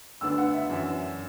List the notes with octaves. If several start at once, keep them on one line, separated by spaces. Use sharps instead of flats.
D2 D3 B3 D4 E6
F#5
E5
F#2 E3 D4